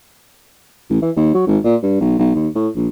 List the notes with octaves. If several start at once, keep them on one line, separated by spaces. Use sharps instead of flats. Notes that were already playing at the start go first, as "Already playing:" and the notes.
A1
E3
D#2
F#3
G#1
A#2
G2
B1
B1
D#2
A2
A#1